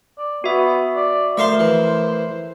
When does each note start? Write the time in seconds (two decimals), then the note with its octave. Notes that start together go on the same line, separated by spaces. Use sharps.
0.18 D5
0.44 B3 F#4 E5
0.96 D5
1.37 A3 A#4 C5 E5 F5 C6 C7
1.59 E3